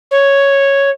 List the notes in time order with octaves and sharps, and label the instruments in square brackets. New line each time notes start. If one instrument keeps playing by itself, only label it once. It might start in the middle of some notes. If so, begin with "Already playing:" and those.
[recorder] C#5